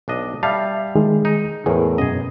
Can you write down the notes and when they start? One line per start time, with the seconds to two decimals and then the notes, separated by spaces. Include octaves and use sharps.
0.08 B1 D4 D#5
0.43 G3 E5 F5 A5
0.95 D#3 G#3 G#4
1.25 D#4
1.66 E2 A2 G#4 A#4
1.98 F#2 B2 C#4 G#4 D#5